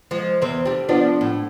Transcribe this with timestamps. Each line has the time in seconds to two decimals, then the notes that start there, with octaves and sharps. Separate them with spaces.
0.11 F3 G#3
0.42 E2 C4
0.65 G3 D4
0.89 F3 B3 D4
1.21 A2